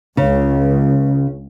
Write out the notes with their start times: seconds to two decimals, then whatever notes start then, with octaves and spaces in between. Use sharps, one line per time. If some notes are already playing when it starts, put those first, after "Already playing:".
0.17 C#2 C#3